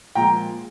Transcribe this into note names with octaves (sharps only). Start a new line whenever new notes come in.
A#2 F3 G#3 G5 A#5